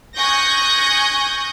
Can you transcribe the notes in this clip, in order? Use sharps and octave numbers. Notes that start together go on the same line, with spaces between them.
G#5 C#6 D#6 F#6 G6 A#6